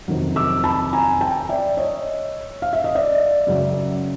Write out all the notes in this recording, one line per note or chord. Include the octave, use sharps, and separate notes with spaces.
F2 C3 D#3 F#3
D6 E6
A5 B5
G#5 A#5
G5 A5
D5 E5
C#5 D#5
F5
E5
D#5
D5 E5
F#2 C#3 F#3